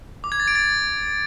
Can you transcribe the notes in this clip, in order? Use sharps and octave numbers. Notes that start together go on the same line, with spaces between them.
D6
G#6
A6
D7
A6